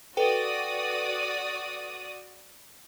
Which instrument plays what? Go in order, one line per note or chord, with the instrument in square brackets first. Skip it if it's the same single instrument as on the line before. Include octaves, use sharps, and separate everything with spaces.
[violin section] F#4 D5 D#6 [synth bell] A4 B4 G5